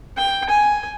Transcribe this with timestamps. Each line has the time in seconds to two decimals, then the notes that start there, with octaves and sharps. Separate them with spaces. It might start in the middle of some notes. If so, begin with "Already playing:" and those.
0.17 G5
0.49 G#5